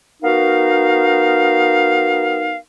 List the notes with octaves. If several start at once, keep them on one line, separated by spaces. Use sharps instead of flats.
B3 D#4 F#4 A#4 F5